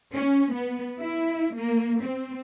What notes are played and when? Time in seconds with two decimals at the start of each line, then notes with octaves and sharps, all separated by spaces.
0.14 C#4
0.53 B3
1.00 E4
1.55 A#3
2.03 C4